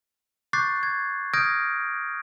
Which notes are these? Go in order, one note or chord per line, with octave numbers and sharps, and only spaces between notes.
C#6 D6 F#6 G6 A6 C7
G#6
D#6 F6 G6 G#6 A#6 D7